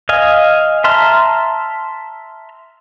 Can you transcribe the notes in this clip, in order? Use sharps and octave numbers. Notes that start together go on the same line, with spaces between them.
D#5 F5 G#5
E5 A5 A#5 C6 F6